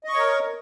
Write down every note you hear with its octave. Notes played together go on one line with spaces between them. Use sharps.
A#4 C#5 D#5 C#6